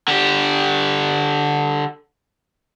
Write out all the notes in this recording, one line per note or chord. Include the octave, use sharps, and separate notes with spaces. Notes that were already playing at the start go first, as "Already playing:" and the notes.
D3 G4